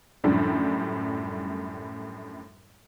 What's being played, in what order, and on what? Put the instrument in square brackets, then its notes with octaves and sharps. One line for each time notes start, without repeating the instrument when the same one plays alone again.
[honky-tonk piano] F#2 A2 D3 F3 G3 D4